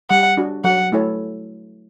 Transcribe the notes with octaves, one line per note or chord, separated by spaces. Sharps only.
G3 F#5
D4 F#4
F#3 F#5
A3 E4 A4 C#5